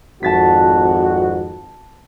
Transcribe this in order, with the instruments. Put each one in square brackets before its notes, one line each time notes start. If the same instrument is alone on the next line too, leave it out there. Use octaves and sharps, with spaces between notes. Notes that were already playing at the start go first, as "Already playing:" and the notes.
[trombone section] G#1 F2 F#4 [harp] A5 A6 B6